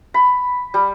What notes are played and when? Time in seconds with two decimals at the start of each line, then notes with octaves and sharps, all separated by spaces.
0.14 B5
0.74 G3